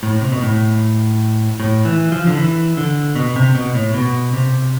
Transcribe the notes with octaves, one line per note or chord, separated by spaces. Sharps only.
A2
C3
B2
A2
A2
E3
F3
D3
E3
D3
B2
C3
B2
A2
B2
C3